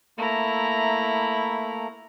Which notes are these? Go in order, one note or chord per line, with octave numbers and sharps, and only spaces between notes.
A3 A#3 E4 A#5